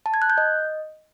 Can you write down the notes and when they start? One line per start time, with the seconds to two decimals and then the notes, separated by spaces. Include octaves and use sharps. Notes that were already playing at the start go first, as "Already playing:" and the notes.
0.06 A5
0.14 G#6
0.22 F#6
0.30 G6
0.38 D#5